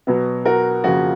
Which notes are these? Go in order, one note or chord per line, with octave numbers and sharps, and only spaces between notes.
B2 F#3 B3
F#4 A#4
F2 C#3 F3 A#3 F#4